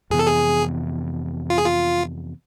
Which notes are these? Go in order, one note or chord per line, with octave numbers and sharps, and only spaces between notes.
F2 C3 E3 B3 G#4
A4
G#4
F4
G#4
F4